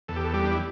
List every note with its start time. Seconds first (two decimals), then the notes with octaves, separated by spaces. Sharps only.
0.08 E2 A4
0.16 G4
0.25 A4
0.34 G3 G4
0.44 D4
0.51 E4